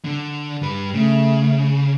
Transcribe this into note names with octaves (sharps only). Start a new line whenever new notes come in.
D3
G2 B4
C#3 A3